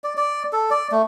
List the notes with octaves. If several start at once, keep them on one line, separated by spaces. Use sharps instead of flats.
D5
D5
A4
D5
A3